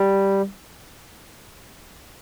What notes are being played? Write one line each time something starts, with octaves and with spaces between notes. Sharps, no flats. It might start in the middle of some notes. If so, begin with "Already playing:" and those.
Already playing: G3